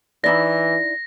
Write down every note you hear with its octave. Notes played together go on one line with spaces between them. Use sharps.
E3 D#4 E4 D5 A#6